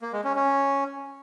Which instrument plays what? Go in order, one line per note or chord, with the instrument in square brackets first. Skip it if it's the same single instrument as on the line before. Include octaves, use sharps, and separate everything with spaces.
[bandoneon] A#3
G#3
C#4
C#4